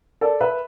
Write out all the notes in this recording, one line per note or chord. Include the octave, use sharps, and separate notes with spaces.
A4 D5
B4 E5